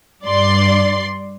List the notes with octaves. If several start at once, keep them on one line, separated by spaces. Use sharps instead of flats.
G2 D5 C6